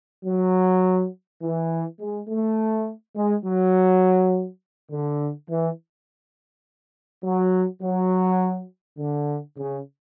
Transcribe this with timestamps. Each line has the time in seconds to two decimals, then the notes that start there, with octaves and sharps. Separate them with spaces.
0.25 F#3
1.42 E3
2.00 G#3
2.29 A3
3.16 G#3
3.45 F#3
4.91 D3
5.49 E3
7.24 F#3
7.82 F#3
8.99 D3
9.57 C#3